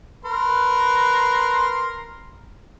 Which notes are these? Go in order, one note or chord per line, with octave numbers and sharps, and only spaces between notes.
A#4 B4 C6